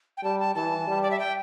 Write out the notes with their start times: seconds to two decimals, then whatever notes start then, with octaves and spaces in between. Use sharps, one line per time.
0.17 G5
0.23 G3 A5
0.40 A5
0.55 E3 A5
0.87 G3
1.02 D5
1.11 E5
1.19 G5